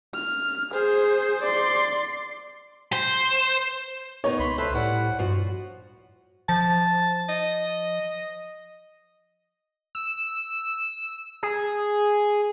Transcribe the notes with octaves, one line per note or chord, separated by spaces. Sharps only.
F6
G#4 C5
D5 C6
C5
B3 D#4 C#5
C#2 B5 C6
A4 B4 C5 E5
A2 G3 E4 F#5
G2 F3 F#4
F3 A5
D#5
E6
G#4